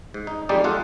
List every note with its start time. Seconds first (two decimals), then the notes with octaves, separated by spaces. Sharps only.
0.14 G#2
0.27 D#4
0.49 F2 G3 G#3 D#4 G4 D5
0.64 G#3 F4 A4 F5 F#5